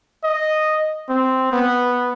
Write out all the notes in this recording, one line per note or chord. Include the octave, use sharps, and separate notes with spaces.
D#5
C4
B3